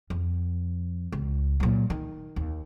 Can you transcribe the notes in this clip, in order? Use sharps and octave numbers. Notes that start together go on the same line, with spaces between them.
F2
C#2
A#2 F#3
D#3
D#2